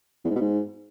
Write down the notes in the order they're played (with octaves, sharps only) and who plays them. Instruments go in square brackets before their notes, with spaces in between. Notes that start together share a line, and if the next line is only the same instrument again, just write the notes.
[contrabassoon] E2
G#2
B2
G#2